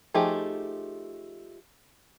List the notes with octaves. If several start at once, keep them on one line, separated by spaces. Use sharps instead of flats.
F3 A3 D#4 G4 G#4